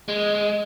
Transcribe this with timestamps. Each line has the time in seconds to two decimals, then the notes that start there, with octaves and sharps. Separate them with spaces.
0.08 G#3